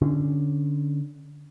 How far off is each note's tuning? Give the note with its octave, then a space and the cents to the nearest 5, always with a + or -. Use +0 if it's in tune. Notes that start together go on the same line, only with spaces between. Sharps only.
D3 +0 C#4 +0